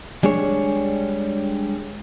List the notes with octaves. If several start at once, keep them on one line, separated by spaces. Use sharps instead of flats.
G3 G#3 D4 G#4 C#5